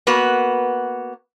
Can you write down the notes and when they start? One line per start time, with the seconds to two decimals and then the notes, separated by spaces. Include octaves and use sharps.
0.07 A#3 B3 F#4 B4